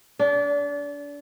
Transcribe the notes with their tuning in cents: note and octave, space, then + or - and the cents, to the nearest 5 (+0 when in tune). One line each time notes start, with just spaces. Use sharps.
D4 -30